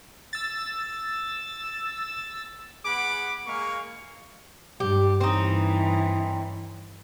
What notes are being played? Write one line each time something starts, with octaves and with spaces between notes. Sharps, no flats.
E6 A6
B3 G#4 F#5 B5 D6
G#3 A#3 F5 G#5 C#6
G2 G4
G2 E3 C4 C#4 D#4